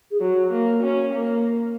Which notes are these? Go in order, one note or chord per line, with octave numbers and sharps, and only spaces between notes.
G#4
F#3 F#4
A#3
C#4
A#3